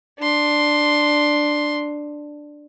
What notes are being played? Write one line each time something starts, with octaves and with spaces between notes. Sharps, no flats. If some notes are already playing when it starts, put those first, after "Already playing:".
D4 C6